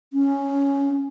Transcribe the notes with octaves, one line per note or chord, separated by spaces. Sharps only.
C#4